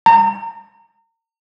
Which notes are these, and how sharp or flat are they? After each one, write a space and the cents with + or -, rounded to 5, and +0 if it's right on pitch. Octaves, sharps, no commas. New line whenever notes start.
A#5 -35